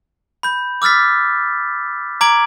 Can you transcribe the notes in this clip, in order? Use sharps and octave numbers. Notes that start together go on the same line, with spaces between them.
B5 G6
D6 E6 F6 A6 B6
A#5 D6 G#6 D7 F#7